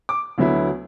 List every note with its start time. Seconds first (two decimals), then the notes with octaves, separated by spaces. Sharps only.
0.09 D6
0.38 D2 D3 F#3 B3 E4